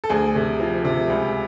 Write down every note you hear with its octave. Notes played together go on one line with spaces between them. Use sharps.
A4
D2 G#4
C3
F3
C3
C#2